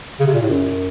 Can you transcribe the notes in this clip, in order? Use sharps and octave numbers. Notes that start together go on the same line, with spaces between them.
C#3
C3
A#2
A2
F#2